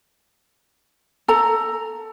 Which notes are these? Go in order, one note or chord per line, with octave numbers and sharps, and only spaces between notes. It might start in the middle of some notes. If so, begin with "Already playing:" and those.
A4 A#5